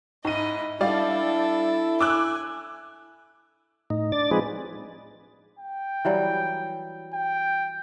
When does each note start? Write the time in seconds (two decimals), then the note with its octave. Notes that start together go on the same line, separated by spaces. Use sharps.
0.25 G#2 E4 D#5 D#7
0.81 G3 D4 E4 A4 D5 F5
2.00 G#5 D6 E6 F#6
3.90 A2 D#4
4.12 D4 D5 A6
4.31 F3 G#3 C4 D#4 G#4 B4
5.59 G5
6.05 E3 F#3 G3
7.13 G5